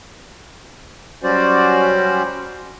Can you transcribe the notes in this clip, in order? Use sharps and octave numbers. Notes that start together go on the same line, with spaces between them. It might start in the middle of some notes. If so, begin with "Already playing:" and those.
F#3 G3 C#4 F#4 C5 D5